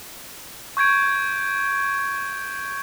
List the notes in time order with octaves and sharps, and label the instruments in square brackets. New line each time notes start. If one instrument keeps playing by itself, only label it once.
[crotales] C#6 G6 G#6 D7